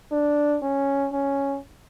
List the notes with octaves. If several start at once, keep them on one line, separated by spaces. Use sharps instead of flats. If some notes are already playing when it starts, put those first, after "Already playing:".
D4
C#4
C#4